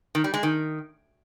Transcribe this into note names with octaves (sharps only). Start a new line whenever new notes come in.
D#3
G3
G#3
D#3